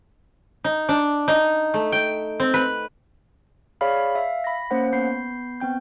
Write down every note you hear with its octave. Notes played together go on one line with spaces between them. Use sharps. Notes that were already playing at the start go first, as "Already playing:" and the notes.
D#4
D4
D#4
A3
G5
C4
B4
G#4 C#5 D5 F5 B5 F6
E5 F5
B5 A#6
A#3 C#4 C5 F#5 F#6
B3 B5 G6 C7
B3 C4 G5 G6